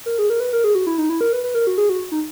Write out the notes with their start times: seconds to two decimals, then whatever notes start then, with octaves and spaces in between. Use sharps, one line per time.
0.06 A#4
0.18 G#4
0.30 A#4
0.40 B4
0.53 A#4
0.64 G#4
0.75 F#4
0.87 E4
0.98 D#4
1.09 E4
1.21 A#4
1.33 B4
1.44 B4
1.54 A#4
1.67 F#4
1.78 G#4
1.89 F#4
2.12 D#4